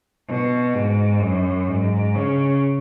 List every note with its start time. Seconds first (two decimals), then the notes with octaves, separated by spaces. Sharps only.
0.28 B2
0.74 G#2
1.22 F#2
1.68 G#2
2.15 C#3